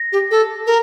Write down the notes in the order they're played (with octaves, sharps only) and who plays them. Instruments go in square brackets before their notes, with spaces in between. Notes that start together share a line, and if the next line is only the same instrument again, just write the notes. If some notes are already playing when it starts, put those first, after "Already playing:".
Already playing: [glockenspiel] A#6
[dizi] G4
A4
A#4